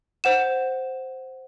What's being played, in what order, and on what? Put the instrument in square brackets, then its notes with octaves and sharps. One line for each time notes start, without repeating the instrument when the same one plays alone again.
[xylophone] C5 F#5 E7